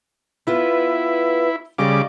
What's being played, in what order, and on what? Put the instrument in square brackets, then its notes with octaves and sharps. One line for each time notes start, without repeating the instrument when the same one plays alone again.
[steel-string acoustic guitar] B3 F4 B4 [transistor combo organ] E4
[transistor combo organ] C#3 G3 D6 [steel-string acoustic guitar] D5 D#5 F5